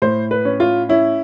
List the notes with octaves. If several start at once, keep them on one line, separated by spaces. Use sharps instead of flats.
A2 C5
B4
C#4
F4
C#4 E4